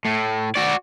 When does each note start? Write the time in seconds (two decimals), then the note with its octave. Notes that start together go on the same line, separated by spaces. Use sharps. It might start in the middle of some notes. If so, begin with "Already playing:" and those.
0.05 A2
0.55 F#4 D5